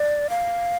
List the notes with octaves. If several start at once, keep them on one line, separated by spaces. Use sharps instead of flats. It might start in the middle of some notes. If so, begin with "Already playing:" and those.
Already playing: D5
F5